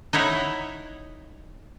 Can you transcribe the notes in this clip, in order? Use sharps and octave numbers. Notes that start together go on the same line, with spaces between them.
D#4 E4 C#5 F#5